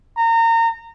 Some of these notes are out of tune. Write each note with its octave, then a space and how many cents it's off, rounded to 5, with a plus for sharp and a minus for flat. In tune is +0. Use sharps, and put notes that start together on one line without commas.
A#5 -30